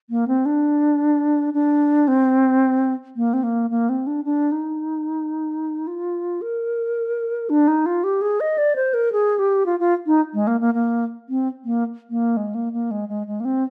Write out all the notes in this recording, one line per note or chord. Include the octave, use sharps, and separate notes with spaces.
A#3
C4
D4
D4
C4
A#3
C4
A#3
A#3
C4
D4
D4
D#4
F4
A#4
D4
D#4
F4
G4
G#4
D#5
D5
C5
A#4
G#4
G4
F4
F4
D#4
G#3
A#3
A#3
A#3
C4
A#3
A#3
G#3
A#3
A#3
G#3
G#3
G#3
A#3
C4